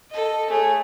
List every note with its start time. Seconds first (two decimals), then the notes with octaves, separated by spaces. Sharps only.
0.11 A4 D#5
0.50 A3 G#4 C#5